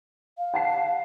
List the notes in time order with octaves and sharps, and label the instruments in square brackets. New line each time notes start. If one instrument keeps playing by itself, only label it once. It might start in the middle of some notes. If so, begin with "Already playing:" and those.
[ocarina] F5
[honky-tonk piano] F#5 A5 C7